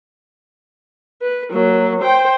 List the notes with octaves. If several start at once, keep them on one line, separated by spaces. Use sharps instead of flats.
B4
F#3 A#3
C5 G5